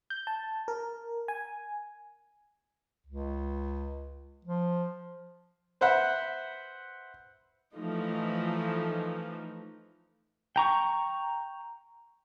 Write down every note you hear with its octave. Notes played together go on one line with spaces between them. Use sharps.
G6
A5
A#4
G#5
C#2
F3
B4 C5 E5 F#5 B5
E3 F3 A3 D#4
G5 A#5 C#6